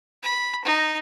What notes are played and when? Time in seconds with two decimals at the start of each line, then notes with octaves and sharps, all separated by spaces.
0.23 B5
0.65 D#4